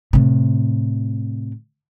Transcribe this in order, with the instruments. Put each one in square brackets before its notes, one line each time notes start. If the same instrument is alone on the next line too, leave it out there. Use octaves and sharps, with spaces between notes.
[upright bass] A2 C3